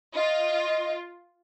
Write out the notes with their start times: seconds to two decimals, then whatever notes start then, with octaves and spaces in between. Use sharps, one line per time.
0.15 F4 D#5